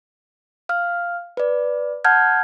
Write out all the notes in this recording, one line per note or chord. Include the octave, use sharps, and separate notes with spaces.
F5 F6
B4 D5
F#5 A5 F6 G6 G#6